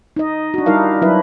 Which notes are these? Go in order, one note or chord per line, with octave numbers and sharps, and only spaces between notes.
D#4 D#5
D4 F#4
G3 D#4 E4 A#4 F5
F#3 D4 E4 B4 E5